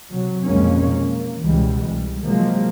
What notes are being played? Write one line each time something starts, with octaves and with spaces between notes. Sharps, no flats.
C3 F#3
B1 F2 A#2 G#3 A#3 C#4
A#3
C#2 B2 E3 G3 G#3
C2 G3
C3 F3 F#3 G#3 A#3